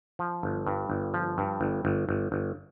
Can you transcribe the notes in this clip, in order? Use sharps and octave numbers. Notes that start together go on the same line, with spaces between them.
F3
G1
G2
G1
F3
G2
G1
G1
G1
G1